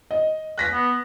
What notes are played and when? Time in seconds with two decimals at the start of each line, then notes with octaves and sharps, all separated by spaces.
0.11 D#5
0.58 F#6 A#6 B6
0.72 B3